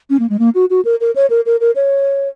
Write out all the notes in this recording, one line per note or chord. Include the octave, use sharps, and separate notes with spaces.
C#4
A#3
G#3
A#3
F#4
F#4
A#4
A#4
C#5
A#4
A#4
A#4
C#5